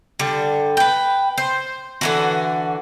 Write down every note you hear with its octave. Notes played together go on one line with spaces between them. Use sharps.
D3 G3
B4 G5
C5
D3 E3 F#4